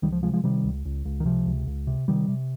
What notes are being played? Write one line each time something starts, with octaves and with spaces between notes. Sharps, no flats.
C#2 D#3 G3
F3
C3 F3 G#3
F3 G#3
C3 D#3 G3
C#2
C#2
C#2
D#3
C3 F3
C#2
C#2
C3
C3 D#3 G3
C3